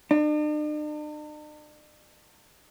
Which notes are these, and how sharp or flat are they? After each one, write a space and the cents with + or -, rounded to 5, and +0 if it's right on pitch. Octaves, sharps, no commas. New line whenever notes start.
D4 +45